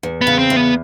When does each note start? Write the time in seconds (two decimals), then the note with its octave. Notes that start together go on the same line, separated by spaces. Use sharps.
0.03 E2
0.21 B3
0.27 C#3
0.39 C4
0.50 E2
0.56 B3